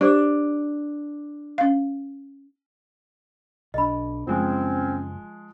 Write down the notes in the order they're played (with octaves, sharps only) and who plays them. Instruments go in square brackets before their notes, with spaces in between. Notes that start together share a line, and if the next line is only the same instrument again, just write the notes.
[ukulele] D4 [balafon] G4 C5
[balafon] C#4 F5
[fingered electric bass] B1 D4 [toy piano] D#5 B5
[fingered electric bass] F#1 [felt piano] F3 G#3 [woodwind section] C4 C#4